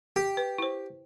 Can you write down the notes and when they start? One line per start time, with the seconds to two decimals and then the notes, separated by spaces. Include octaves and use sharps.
0.16 G4
0.37 B4
0.58 E4 C5